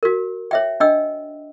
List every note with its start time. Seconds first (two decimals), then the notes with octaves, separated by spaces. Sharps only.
0.03 F#4 A#4
0.51 C#5 E5 G5
0.80 D4 D#5 G5 E6